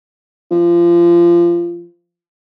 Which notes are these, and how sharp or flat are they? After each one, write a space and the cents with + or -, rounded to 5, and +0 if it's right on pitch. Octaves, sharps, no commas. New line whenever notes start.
F3 -25